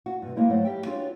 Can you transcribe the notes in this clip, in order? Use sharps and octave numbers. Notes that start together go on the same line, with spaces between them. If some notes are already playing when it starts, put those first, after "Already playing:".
F#4
G2 C3
G3 G#3 A#3 D#4 E4
G#2 F#3 A3 C5 D#5 F#5
G3 G4 E5 G5
C4 D4 F4 F#4 G#4 C#5